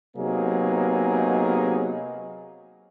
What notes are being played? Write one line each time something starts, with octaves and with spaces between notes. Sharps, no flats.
C3 F#3 A#3 B3 D#4 G#4